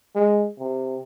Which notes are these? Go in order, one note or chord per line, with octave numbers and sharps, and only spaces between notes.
G#3
C3